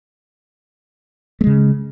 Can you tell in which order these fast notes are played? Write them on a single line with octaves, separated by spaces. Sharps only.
A3 G#3 C#3